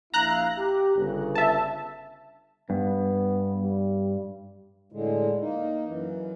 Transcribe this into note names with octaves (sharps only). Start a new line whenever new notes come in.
A#1 E4 F5 A#5 F#6
G4
G1 C#3
E5 A5
G2 B3
G3
A2 D3 G#3
A#3 D#4
F#2 E3